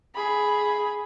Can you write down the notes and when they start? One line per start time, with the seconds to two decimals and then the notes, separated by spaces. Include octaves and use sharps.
0.15 G#4 B5